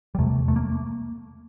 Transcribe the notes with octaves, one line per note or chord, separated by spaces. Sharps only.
G3
E2 C3 A3
A3
A#3